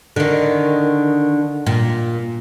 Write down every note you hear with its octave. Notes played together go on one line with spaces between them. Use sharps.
D3 D#3
A#2